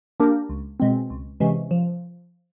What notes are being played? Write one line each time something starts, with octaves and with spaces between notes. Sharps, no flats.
A#3 D4 G4 A#4
C#2
B2 G#3 C4
C#2
C3 E3 G#3 C#4
F3